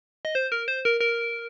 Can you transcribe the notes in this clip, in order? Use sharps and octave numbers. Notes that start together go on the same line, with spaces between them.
D#5
C5
A#4
C5
A#4
A#4